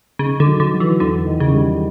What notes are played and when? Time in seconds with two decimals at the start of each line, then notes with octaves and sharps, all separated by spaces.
0.19 C#3 D#4
0.40 D3
0.46 F#3
0.60 D3
0.73 F#3
0.80 E3
1.00 E2 D3
1.26 D#3
1.40 C#3
1.53 G3